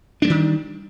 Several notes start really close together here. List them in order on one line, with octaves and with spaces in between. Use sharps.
D4 G#3 G3 D#3